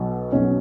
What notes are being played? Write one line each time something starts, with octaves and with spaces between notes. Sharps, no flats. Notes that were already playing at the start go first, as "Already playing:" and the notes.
Already playing: B1 B2 F#3
B1 B2 F#3 C#4